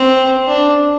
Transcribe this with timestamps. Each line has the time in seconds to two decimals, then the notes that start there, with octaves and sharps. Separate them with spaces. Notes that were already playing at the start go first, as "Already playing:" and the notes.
Already playing: C4
0.48 D4